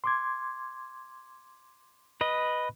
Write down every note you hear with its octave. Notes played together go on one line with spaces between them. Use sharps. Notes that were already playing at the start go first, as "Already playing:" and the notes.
C6 D6 G#6
B4 D#5